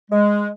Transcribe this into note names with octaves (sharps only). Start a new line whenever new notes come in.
G#3